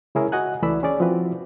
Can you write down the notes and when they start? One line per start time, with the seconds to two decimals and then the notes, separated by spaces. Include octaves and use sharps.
0.15 C#3 G#3 C#4 E4 G#4 A#4
0.32 F#4 D#5 F#5 G#5 F#6
0.62 C#2 E3 A3 D5 B5 E6
0.83 C#4 G#4 D5
1.00 F3 C4 E4 F#4 B4